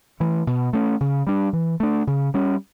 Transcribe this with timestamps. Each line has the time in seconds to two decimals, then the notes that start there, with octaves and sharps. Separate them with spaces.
0.20 E3 A3
0.47 B2
0.73 A3 C#4
1.01 C#3
1.27 G3 D4
1.53 E3
1.80 A3 D4
2.07 C#3
2.34 G3 C#4